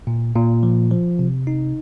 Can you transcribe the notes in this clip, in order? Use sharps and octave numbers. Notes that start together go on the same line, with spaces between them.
A#2
A#2
F3
F3
C3
D#4